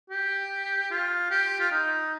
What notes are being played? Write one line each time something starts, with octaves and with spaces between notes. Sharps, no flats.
G4
F4
G4
F4
D#4